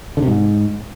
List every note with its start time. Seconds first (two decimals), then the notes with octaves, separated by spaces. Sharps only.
0.17 D3
0.22 C3
0.28 G#2